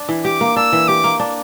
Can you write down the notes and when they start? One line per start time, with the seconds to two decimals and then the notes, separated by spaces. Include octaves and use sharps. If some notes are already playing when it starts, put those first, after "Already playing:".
Already playing: D4
0.09 E3
0.25 G4 D6
0.41 A#3
0.56 D4 E6
0.72 E3
0.88 G4 D6
1.04 A#3
1.20 D4